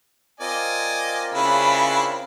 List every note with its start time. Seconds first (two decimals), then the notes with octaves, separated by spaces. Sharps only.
0.40 C4 F4 A#4 D5 D#5 G#5
1.34 C#3 D4 E4 B5